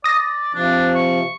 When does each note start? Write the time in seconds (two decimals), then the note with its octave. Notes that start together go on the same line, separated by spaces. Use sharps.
0.04 D5 D#6 A#6
0.55 C3 F3 D4
0.95 C#6